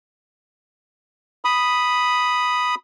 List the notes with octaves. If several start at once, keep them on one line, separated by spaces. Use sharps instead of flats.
B5 D#6